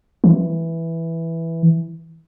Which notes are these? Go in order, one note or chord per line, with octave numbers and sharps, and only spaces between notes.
E3